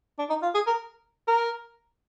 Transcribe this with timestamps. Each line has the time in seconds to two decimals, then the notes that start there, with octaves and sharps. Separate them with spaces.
0.19 D4
0.30 D#4
0.43 F4
0.54 G#4
0.67 A#4
1.28 A#4